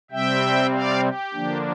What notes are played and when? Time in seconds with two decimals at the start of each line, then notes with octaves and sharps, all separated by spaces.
0.11 C3 G3 C4 E5 G5
0.72 D5 F5
1.03 G4
1.33 D3 F3 A#3 D4